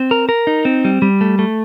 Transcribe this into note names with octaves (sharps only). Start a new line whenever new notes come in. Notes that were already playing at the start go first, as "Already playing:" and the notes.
Already playing: C4
A#4
A#4
D#4
C4
G3
G3
A3
A3